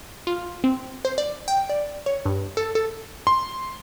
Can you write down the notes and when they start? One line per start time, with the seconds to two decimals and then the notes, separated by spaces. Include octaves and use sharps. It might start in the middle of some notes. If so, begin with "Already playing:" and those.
0.27 F4
0.64 C4
1.05 C5
1.18 D5
1.48 G5
1.70 D5
2.06 C#5
2.25 G2
2.57 A4
2.75 A4
3.27 C6